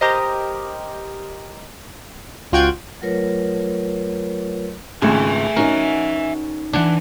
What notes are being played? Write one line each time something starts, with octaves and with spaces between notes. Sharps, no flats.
G4 A#4 C5 D#5
C#2 F4 F#4 G5 F#6 G#6
F#3 A3 F4 A#4 B4 C#5
G#1 C#2 A3 G#4 E5 G#5
C#4 D#4 F#4 A#4 D#5
C#2 E3 D4 F#5